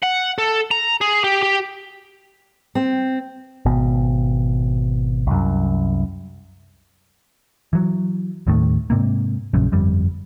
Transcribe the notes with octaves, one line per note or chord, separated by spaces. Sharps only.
F#5
A4
A#5
G#4
G4
G4
C4
G#1 B2
C2 F#2
E3 F#3
D#2 A2 D#3 A3
G#2 C3 A#3
A#1 F#2 C#3
G1 F2 G3